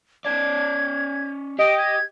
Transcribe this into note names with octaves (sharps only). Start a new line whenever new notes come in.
C#4 D5 G#6
G4 D#5 D7
G#6